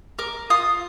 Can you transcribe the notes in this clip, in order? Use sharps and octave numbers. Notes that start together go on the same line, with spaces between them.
A#4 D6
F4 D#6